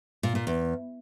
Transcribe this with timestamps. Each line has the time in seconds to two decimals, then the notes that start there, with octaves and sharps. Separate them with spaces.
0.23 A#2
0.35 A#2
0.47 E2